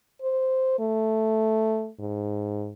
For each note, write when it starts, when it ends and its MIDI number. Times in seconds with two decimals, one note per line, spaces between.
0.22 0.77 72
0.79 1.89 57
1.99 2.72 44